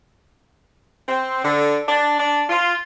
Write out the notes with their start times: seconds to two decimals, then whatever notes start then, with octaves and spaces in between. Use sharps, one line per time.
1.07 C4
1.43 D3
1.87 D4
2.18 D4
2.49 F4